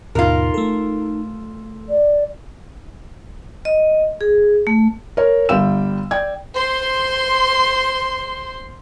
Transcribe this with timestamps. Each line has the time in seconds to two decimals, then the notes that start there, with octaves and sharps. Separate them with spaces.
0.15 D#2 G#2 B2 D#4 F4 A#4
0.54 A3 A4
1.89 D5
3.65 D#5
4.21 G#4
4.67 A3
5.17 A#4 C#5
5.49 G1 G3 F5 G5 E6 E7
6.11 D5 G5 G#6
6.55 C5 C6